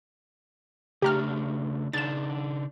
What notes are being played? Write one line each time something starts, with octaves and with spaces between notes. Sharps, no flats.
C#3 A3 D4 G4 A#5 F6
C#3 D4 D#4 A6 E7